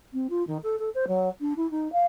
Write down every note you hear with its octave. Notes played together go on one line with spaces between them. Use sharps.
C4
F4
D#3
A4
A4
C5
F#3
D4
E4
D#4
F5